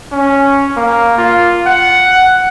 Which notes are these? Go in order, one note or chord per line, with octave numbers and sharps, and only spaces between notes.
C#4
A#3
F4
F#5